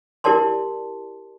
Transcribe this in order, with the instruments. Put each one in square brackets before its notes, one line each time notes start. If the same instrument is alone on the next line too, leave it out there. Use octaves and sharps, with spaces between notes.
[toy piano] E4 G4 A#4 D5 A5 C6